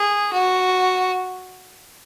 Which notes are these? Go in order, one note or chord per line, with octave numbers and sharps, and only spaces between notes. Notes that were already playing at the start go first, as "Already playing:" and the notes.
Already playing: G#4
F#4